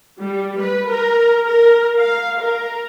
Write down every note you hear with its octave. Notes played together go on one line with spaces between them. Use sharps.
G3
B4
A#4
A#4
F5
A#4